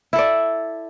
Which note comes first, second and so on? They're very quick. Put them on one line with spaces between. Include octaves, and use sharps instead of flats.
E4 A4 D5